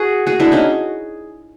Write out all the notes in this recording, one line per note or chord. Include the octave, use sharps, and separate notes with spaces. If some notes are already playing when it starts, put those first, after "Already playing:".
Already playing: F#4 G#4
F#4 G#4
D4 E4
C#4 D#4